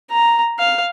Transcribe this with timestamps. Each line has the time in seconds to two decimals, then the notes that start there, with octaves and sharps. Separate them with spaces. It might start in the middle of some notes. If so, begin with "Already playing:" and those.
0.11 A#5
0.59 F5